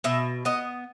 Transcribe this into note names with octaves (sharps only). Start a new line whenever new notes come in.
B2 E5
B3 D#5